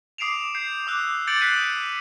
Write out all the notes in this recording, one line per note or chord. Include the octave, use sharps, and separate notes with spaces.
D6 D#6 C7 D7 E7 F7
G6 C7
D6 E6 F#6
D6 G6 A6 C#7 D7 F#7
F#6 B6 C7 D#7 F#7
D#6